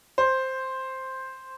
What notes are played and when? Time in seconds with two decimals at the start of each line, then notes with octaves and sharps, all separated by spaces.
0.18 C5